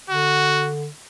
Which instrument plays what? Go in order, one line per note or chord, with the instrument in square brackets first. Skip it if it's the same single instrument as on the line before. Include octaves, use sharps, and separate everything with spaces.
[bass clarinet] D3 [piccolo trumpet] F#4